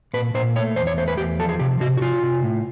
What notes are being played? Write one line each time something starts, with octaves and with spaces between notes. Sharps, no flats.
A#2 B4
A#2 C5
A3 C#5
E2 C5
C#5
A3 C5
B4
E2 G4
F3 A4
G#4
C3 G4
C3 F#4
F#4
C3 F4
C3
A2